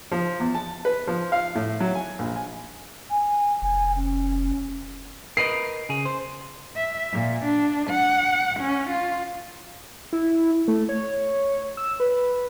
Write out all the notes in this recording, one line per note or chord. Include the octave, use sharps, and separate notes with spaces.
F3
E2
A5
B4
F3
F5
A2
F#3
G#5
A#1
G#5
G#5
F1 G#5
C#4
A#4 B4 D#5 C7
C#3 G#4
C5
E5
A#2
D4
F#5
C#4
F4
E4
A3
C#5
E6
B4